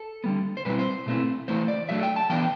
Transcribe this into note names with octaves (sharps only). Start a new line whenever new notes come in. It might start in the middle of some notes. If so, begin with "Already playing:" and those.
Already playing: A4
D3 G3 B3
C5
B2 G3 C4 E4 B4
C5
B2 A3 C4 E4
E3 A3 E4 C5
D5
F#3 A3 D4 E5
G5
A5
E3 B3 D4 G5